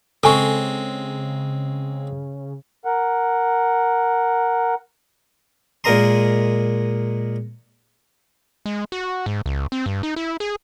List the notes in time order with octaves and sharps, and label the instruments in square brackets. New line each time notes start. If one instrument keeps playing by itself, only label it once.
[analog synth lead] C#3 [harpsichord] G#3 C4 [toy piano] A4 G#5 C#6
[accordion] A#4 F#5
[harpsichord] A#2 G#3 A#4 D#5 A#5 C6
[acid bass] G#3
F#4
G#2
C#2
C4
G2
D#4
E4
G#4